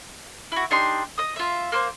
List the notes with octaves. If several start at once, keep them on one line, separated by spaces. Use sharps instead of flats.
E4 F#4
D4 D#4 G4 C6
D#5 D#6
F4 E5
A#3 C5